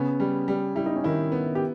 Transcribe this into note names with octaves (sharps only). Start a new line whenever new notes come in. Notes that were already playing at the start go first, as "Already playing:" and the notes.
Already playing: C#3 B3 C#4
G3
G3
G3 E4
D#4
C#4
D#3 D#4 E4
B3
G4